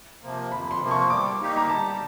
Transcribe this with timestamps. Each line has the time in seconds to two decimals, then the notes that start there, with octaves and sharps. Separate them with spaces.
0.22 C3 F3 A#3
0.51 F2 B5
0.71 C6
0.81 C3 F3 A#3
0.91 C#6
1.10 G3 D6
1.40 A#3 D#4 G4
1.57 A#5
1.69 G3 A5